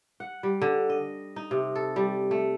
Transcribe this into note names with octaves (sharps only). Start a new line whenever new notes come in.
F#5
G3
D3
D#5
D#4
C3
A4
G3
A3